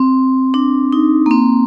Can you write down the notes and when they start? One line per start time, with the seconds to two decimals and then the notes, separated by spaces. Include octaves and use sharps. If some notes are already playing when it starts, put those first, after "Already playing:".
Already playing: C4
0.54 D4
0.93 D#4
1.26 A#3
1.31 C4